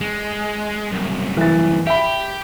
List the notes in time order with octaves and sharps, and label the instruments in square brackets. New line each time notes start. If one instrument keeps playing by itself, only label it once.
[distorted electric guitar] G#3
C2 F#2
[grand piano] E3 A6
[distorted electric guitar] G4 [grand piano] E5 B5